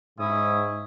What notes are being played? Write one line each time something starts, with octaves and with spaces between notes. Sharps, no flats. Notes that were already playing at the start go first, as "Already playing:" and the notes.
G#2 C#4 E4 D#6